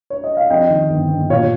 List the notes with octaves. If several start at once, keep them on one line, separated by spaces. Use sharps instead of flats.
C#5
D#5
F5
F2 D#5 G5
D#3
G1
G1
A#2 C#5 F5